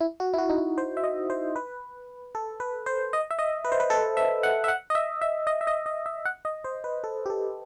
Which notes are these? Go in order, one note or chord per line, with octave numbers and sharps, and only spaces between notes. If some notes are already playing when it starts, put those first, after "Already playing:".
E4
F#4
E4
F#4
D#4
E4
C5
E5
D#5
C5
B4
A4
B4
C5
D#5
E5
D#5
B4
C5
B4
A4
E5
F#5
E5
F#5
D#5
E5
E5
D#5
E5
D#5
D#5
E5
F#5
D#5
C5
B4
A4
G4
A4